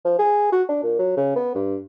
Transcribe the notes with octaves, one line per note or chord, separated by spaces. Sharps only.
F3
G#4
F#4
D4
A#2
F#3
C#3
B3
G2